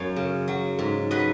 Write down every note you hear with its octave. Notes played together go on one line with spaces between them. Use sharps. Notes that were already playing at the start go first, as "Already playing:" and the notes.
Already playing: F#2 C#5 F5
C#3
F#3
G#2
F#3 B4 D#5